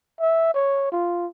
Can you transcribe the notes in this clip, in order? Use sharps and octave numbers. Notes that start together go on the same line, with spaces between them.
E5
C#5
F4